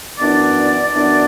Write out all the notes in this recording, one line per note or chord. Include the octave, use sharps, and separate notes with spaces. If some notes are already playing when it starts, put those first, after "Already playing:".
F#2 E3 B3 D4 D5
F#2 E3 B3 D4